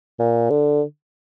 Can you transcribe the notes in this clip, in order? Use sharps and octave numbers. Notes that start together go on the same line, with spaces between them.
A#2
D3